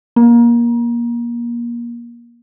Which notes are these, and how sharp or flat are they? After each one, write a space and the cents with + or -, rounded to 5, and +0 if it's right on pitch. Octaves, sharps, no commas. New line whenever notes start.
A#3 +25